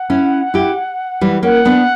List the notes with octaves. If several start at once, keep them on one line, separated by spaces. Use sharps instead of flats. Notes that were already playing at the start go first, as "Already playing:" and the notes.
Already playing: F#5
C#4 E4
E4 G4
E3 G3
A#3 C#4 F#5
B3 D4